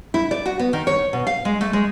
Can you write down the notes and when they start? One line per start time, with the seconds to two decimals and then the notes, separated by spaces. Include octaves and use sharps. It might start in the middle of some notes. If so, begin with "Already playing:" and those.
0.14 E4
0.31 D5
0.46 F#4
0.59 B3
0.73 D#3
0.87 C#5
1.13 B2
1.27 F5
1.45 G#3
1.61 A3
1.73 G#3